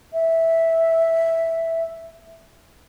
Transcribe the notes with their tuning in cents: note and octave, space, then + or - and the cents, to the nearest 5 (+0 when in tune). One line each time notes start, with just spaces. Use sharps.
E5 -5